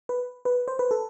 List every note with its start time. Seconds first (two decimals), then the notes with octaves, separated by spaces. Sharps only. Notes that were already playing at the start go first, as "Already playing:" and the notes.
0.09 B4
0.45 B4
0.68 C5
0.79 B4
0.91 A4